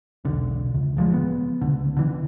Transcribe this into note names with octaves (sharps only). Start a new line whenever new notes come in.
E1 B1 D3
C#2
D1 F3 G3 G#3
B3
C#2 D3
D3 E3